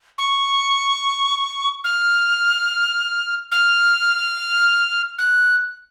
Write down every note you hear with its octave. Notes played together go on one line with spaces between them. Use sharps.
C#6
F6
F6
F#6